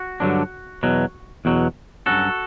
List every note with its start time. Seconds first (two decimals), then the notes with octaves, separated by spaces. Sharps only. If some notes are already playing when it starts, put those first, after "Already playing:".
Already playing: F#4
0.20 G2 D3 F#3 B3 D4
0.83 E2 B2 F#3
1.45 E2 B2 F#3
2.06 G2 F#3 C#4 F#4 A4